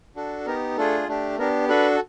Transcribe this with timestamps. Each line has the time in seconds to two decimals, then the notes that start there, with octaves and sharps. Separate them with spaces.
0.16 D4 F#4 A4
0.46 B3 D#4 G4 A#4
0.77 A3 D4 F4 G#4 A4
1.07 A3 D4 G4
1.38 B3 D4 G4 A#4
1.69 D4 F#4 A4 B4